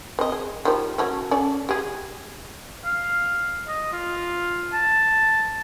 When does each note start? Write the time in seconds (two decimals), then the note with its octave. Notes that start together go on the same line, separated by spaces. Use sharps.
0.19 C4 D#5
0.32 G#4
0.65 D#3 F3 G3
0.98 F#3 A3 C#4
1.31 C#4 A4 D5
1.69 G4 G#4
2.84 F5
3.68 D#5
3.93 F4
4.73 A5